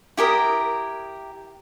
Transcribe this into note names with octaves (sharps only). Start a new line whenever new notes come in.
E4 G4 A#4 D#6